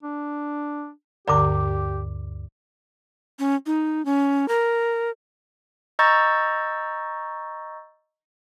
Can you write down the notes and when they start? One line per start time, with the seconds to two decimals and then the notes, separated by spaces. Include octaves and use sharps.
0.03 D4
1.28 D2 G2 D3 G4 D5 A#5 D6
3.39 C#4
3.66 D#4
4.05 C#4
4.48 A#4
5.99 D#5 A#5 C#6 E6 G6 A6